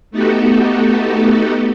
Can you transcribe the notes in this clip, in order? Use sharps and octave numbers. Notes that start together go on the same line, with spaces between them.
A3 B3 D#4 F#4 G4 A4